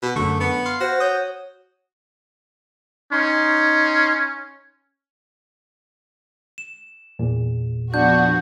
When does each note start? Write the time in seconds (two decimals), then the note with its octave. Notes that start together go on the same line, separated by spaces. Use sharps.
0.03 B2
0.16 F#2 D3 A3
0.40 B3
0.66 F5 C6
0.81 F#4 C5
1.00 C#5 D#6 G6
3.12 C#4 D#4 C6
6.58 E7
7.19 E2 A#2
7.94 F3 B3 D4 F#4 G6